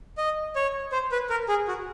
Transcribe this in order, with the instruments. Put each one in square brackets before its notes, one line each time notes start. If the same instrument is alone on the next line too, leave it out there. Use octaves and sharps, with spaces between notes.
[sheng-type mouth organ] D#5
C#5
C5
B4
A#4
G#4
F#4